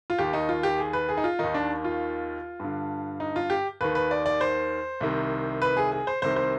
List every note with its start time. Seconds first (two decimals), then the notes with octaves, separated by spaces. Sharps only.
0.10 F4
0.18 D#2 D#3 G4
0.33 D#4
0.49 F4
0.63 G4
0.78 G#4
0.93 B4
1.09 G#4
1.17 D#4
1.24 F4
1.39 D#2 D#3 D#4
1.54 D4
1.84 F4
2.60 G2 D3
3.20 D#4
3.36 F4
3.50 G4
3.81 D#2 D#3 B4
3.95 B4
4.11 D5
4.26 D5
4.41 C5
5.01 C2 C3 D#3
5.62 B4
5.77 G#4
5.92 G#4
6.07 C5
6.22 C2 C3 D#3 C5
6.36 C5